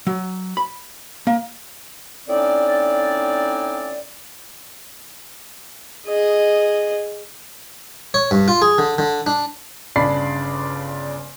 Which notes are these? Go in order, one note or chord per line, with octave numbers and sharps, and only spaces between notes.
F#3
B5
A#3
A2 C4 C#4 D#4 D5
G#4 D#5
C#5
G2
F4
G#4
D3
D3
D4
G1 C#3 D4 D5 B5 C7